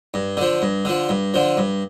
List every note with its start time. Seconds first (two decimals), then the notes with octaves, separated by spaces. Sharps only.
0.14 G2
0.37 D3 F3
0.62 G2
0.85 D3 F3
1.09 G2
1.34 D3 F3
1.57 G2